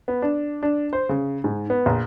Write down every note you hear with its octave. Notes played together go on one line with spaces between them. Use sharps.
B3
D4
D4
C5
C#3
G#2
B3
A#1